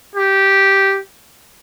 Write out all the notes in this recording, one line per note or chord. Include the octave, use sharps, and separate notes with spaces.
G4